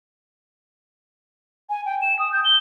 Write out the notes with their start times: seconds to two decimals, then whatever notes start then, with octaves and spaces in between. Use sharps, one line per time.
1.70 G#5
1.86 G5
2.02 E7
2.19 D#6
2.32 G6
2.45 G7